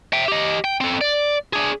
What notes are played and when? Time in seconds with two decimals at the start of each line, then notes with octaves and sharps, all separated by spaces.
0.13 E5 G5
0.28 G4 D#5
0.64 G5
0.81 C4 A4
1.01 D5
1.53 D4 G#4